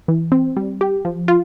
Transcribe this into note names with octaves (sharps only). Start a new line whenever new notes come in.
E3
C4
G3
G4
F3
F4